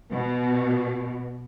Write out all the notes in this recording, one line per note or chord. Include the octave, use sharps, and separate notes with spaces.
B2